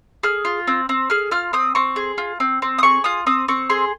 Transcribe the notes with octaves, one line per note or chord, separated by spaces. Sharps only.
G#4 F6
F4
C4
C4
G#4 F6
F4 F6
C4 D#6
C4 C#6
G#4
F4
C4
C4
D#6
G#4 C#6
F4 D#6
C4 D#6
C4 C#6
G#4 C6